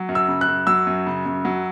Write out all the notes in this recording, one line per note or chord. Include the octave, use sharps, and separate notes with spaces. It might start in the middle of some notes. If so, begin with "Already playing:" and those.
Already playing: F#3
F#2
E6
C#3
F#6
F#2
F#3 E6
F#2
C#3
F#2
F#3